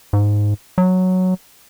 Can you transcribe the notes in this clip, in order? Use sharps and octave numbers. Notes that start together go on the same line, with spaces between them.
G#2
F#3